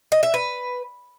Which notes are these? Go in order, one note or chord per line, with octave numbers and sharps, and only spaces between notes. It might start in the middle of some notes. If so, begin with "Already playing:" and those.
D#5
E5
B4